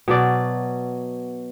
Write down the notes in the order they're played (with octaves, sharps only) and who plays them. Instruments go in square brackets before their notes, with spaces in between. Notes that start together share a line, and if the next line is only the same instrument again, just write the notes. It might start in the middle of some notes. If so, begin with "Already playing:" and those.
[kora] B2 F#3 D5